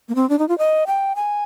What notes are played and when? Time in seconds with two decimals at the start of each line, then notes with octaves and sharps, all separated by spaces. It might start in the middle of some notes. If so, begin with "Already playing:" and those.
0.09 A#3
0.15 C4
0.29 D4
0.39 D#4
0.48 F4
0.58 D#5
0.87 G5
1.16 G#5